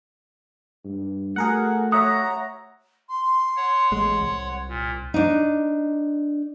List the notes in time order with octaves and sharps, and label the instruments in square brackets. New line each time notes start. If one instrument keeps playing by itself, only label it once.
[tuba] G2
[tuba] A3 [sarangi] F#4 [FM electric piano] G#4 A#4 F#5
[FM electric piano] C#5 E5 F#5 [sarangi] A#5 [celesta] D#6
[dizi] C6
[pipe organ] C#5 F#5
[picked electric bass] A1 G#3
C2
[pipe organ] A#2
[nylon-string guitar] D4 D#4